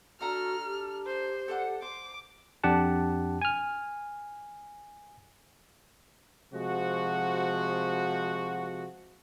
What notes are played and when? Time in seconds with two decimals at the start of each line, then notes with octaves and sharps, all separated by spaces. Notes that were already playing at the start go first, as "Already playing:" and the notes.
0.21 D4 F#4 A4 A#5 F6
0.65 G4
1.06 C5
1.48 A4 D5 F#5
1.82 C5 D6
2.64 F2 D4 G4 F#5 A5
3.41 G#5 F6
6.53 C3 F3 G#3 F#4